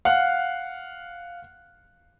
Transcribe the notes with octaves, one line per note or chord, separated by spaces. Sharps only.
F5 F#5